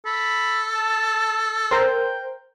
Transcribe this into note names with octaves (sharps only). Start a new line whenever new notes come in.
A4 B5
A5
A#4 C5 G5